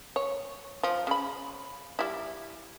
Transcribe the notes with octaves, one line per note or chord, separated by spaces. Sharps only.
C#5
F3
C#3 B5
G3 E4